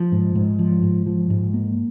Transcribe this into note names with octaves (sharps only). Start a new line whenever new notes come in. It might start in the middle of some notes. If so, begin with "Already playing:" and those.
Already playing: F3
G#2
G#2
F3
G#2
F3
G#2
A#3